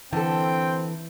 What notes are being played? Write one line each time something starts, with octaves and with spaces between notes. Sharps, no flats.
D3 E3 C4 A4 G5